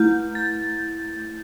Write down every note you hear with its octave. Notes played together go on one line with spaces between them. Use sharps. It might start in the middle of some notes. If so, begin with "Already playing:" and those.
Already playing: A3 E4 G6
A6